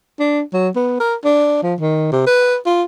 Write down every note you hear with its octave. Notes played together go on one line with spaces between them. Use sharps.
D4
F#3
B3
A#4
D4
F3
D#3
C3
B4
F4